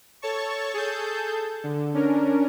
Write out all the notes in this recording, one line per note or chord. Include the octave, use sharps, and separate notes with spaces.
A4 C#5 A5 C#6
G#4 A4 A5 G6
D3
C#4 D4 A#4